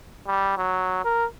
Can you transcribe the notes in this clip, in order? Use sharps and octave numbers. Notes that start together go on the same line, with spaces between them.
G3
F#3
A#4